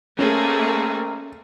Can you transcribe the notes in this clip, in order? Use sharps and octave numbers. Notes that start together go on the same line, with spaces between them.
B1 A3 A#3 C4 C#4 G#4 A#4